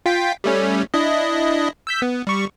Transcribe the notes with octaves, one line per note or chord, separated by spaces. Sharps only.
F4 G5 B6
G3 A3 C#4
D4 E4 D#5
E6 G6 B6
B3
G3 C#6